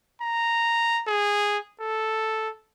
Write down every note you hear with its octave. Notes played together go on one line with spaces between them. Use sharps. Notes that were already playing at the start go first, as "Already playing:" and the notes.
A#5
G#4
A4